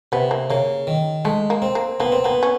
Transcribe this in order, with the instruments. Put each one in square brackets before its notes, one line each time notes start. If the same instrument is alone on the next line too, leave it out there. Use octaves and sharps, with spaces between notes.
[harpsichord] C3 [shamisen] B3
[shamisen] A#3
[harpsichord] C#3 [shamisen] A#3
[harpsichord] D#3
[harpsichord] G#3 [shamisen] A3
[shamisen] A#3
[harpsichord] C4
[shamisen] A#3
[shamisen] A#3 [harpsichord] B3
[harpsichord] C4
[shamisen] A#3 [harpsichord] B3
[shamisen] C#4